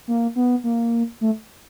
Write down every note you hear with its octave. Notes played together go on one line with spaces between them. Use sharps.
A#3
B3
A#3
A3